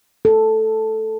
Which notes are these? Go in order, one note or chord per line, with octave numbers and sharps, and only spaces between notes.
A4